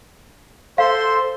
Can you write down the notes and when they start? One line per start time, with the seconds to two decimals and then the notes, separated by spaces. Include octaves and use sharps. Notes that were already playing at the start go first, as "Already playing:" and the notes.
0.78 A4 C5 F5 C6